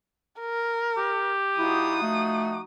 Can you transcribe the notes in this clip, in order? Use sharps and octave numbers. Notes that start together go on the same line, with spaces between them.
A#4
G4
F3 D#4 E4 F#4 D#6
A3